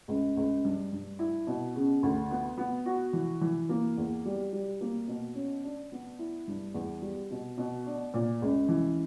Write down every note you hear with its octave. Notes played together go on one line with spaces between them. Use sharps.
C#2
C#2
G2
G2
E4
B2
C#3
D2
B3
B3
F#4
E3
E3
A#3
E2
G3
G3
A#3
B2
C#4
D4
B3
E4
G2
E2
G3
B2
B2
D4
A#2
C#2
E3